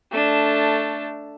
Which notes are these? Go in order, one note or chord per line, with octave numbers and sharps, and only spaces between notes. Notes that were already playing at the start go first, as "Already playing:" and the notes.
A3 D4